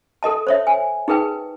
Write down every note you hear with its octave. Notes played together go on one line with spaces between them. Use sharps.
A4 A#4 D#5 A5
C5 C#5 E5
G#5
D#4 G#4 A#4 B4 G5